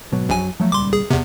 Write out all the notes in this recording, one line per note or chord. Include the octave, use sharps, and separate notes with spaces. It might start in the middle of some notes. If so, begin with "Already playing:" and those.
G#1 B2 F#3
A#1 F#2 F#3 G#5
F3 F#3 A3
D#1 C#2 G3 C6 D6
G#4
E2 C3 B3